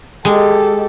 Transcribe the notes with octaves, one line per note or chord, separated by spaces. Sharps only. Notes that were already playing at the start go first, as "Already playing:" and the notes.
G#3 G4 A4